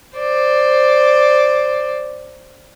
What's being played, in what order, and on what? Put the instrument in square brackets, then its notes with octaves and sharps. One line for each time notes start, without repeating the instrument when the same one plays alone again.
[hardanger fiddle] C5 D5